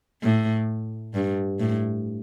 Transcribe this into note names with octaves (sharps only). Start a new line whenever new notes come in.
A2
G2
A2